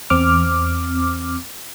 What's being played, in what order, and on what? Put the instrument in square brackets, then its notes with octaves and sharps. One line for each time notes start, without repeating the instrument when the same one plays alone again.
[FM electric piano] E2 C4 D6 F6